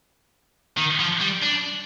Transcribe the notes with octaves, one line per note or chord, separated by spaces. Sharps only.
D#3
F3
G3
D4